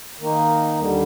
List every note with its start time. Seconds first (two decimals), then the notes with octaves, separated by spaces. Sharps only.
0.20 D#3 A#3 D#4
0.79 D#2 D3 G3